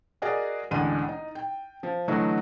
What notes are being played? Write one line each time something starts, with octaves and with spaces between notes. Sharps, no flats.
F#4 G#4 A#4 D5 D#5 G#5
A1 D2 G#3 D4 C6 D#7
D#4
G5
F3
D3 E3 F#3 A3 D#4 F#4